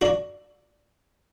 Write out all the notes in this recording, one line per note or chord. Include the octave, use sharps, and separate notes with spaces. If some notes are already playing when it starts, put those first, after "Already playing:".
D4 F#4